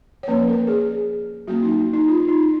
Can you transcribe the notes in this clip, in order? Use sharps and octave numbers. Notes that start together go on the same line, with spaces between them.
C#5
F3 A#3 C#4 B4
A#4
G#4
F#3 A#3 C#4 F#4
D#4
D#4
F4
D#4